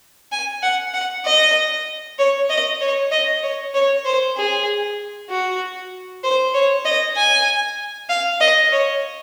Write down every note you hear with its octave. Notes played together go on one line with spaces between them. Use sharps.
G#5
F#5
F#5
D#5
C#5
D#5
C#5
D#5
C#5
C#5
C5
G#4
F#4
C5
C#5
D#5
G#5
F5
D#5
C#5